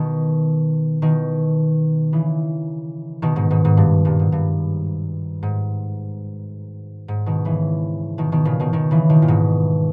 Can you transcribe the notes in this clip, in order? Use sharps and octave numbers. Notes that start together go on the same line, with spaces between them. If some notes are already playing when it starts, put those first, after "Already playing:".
Already playing: B2 D#3
B2 D#3
C#3 E3
B2 D#3
G#2 B2
G#2 B2
G#2
G2
G2 A#2
G#2
G2
G#2
G#2
B2 D#3
C#3 E3
B2 D#3
B2 D#3
A#2 C#3
B2 D#3
B2 D#3
C#3 E3
B2 D#3
A#2
G#2 B2